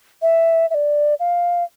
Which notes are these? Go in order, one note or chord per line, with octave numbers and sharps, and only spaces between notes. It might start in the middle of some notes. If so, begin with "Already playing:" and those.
E5
E5
D5
F5